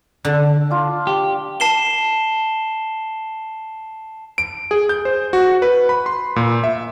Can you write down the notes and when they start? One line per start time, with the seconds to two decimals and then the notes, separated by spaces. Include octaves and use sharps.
0.25 D3
0.71 D4 F4
1.07 G4
1.60 A5 C7 E7 G7
4.38 D7
4.71 G#4
4.89 G6
5.05 C5
5.33 F#4
5.62 B4
5.89 B5
6.06 C6
6.36 A#2
6.64 E5